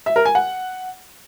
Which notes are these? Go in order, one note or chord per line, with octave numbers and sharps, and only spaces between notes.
E5
A#4
G#5
F#5